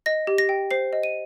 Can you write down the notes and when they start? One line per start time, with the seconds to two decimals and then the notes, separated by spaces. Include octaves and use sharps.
0.06 D#5 A#6
0.27 G4
0.38 A#6
0.49 G5
0.71 C5 C7
0.93 D#5
1.03 D#7